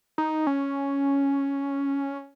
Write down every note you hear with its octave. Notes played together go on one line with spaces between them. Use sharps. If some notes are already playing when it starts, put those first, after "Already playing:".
D#4
C#4